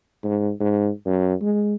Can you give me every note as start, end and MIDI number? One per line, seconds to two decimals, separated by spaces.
0.24 0.51 44
0.60 0.90 44
1.06 1.34 42
1.42 1.75 56